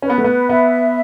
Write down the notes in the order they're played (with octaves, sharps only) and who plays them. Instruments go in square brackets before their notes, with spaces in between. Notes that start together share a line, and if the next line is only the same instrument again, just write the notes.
[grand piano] C#4 [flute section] B4
[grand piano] B3
A3
B3
[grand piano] B3 [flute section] E5